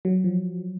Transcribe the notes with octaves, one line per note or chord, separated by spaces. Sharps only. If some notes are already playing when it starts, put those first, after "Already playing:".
F#3
F3